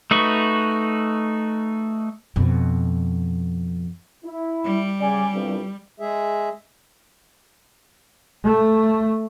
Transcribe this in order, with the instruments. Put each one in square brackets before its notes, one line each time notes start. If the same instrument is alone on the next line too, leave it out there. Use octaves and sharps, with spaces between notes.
[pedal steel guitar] A3 D#4 F#4 B4 C#6
[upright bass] F2 B2
[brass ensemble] E4
[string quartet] G3
[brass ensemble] C#3 D5 G#5
G1 C2 G2
[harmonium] G#3 G#4 E5
[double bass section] A3